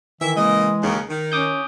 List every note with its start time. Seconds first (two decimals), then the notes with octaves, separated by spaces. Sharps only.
0.21 D#3 E3 E5
0.36 C#3 G#3 A#3 D#5
0.83 D#2 C#3
1.09 D#3
1.32 C#4 D6 D#6 G6